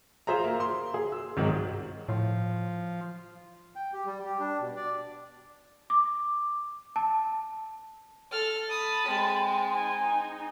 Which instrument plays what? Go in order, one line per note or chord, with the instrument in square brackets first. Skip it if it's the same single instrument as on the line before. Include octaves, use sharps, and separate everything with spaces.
[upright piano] F4 G#4 C5 E5 A#5
A#3
C6
G#4
E6
C2 G#2 D#3 F#3 G#3
[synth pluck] A2 [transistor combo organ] F3
[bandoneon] G5
G4
G3
G4
D4
B2
D5
[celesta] D6
A5
[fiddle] A4 F6
[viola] A5 B5 [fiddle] D#6
[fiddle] G#3 C4
[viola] D#4 [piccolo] G#5